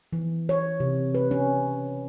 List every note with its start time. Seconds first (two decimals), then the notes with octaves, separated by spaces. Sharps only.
0.13 E3
0.49 C#5
0.80 C3
1.15 B4
1.31 C#4